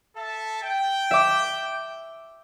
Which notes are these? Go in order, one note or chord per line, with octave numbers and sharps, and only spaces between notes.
A4 E5 A5
G5
E5 D6